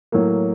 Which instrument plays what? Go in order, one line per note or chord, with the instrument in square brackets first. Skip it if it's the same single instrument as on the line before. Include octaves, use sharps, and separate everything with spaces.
[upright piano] A2 F#3 A#3